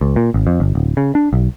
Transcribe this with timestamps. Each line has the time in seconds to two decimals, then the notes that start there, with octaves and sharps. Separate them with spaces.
0.01 C#2
0.16 A#2
0.34 G#1
0.47 F2
0.60 G1
0.75 D1
0.97 C#3
1.15 D4
1.33 B1